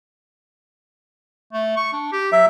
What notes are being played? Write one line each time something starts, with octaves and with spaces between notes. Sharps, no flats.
A3
C#6
D4
G4
F#3 E5